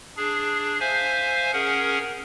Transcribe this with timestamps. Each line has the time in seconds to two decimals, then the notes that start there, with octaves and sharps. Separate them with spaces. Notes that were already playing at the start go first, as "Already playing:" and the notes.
0.17 D4 G#4
0.80 C5 E5 F5 G#5
1.53 C#4 G#4 A#4 F#5